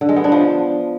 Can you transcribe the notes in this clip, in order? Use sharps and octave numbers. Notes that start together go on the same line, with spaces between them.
D3
G#3
B3
D4
F3